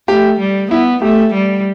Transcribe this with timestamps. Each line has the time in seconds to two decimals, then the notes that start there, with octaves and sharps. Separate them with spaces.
0.08 A3 G4
0.39 G3
0.71 B3 E4
1.02 A3 G4
1.34 G3